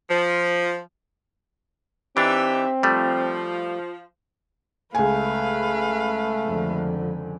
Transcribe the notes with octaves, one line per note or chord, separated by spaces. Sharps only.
F3
E3 C4 D4 D#4 G4 E5
F3 G3 A3
C#2 A3 B4 F5 G#5
F2 D3